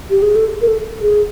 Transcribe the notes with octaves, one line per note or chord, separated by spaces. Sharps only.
G4
G#4
A4
A#4
A4
G#4